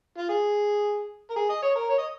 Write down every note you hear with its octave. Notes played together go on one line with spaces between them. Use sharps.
F4
G#4
A#4
G#4
D#5
C#5
A#4
C#5
D#5